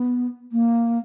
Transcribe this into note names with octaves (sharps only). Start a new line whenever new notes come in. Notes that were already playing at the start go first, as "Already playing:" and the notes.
Already playing: B3
A#3